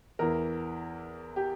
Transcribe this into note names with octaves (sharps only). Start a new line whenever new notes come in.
E2 E3 A#4
G4